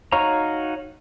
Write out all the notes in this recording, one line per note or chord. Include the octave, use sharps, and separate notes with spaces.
D#4 F#4 C#5 F5 A#5